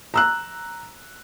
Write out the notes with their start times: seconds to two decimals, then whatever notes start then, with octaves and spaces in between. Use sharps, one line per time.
0.14 A#5 E6 F#6